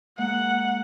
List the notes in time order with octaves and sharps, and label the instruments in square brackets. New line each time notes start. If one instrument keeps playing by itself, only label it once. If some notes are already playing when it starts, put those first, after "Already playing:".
[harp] G#3 A#3 [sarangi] F#5